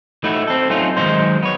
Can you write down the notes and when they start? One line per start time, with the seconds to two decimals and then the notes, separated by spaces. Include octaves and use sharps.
0.24 A3 D#4 E4 F#4
0.48 C4 A4
0.70 F#3 A3 C4 C#4 D#4 F4
0.97 D#3 F#3 G#3 D#4 C5
1.43 B3 C#5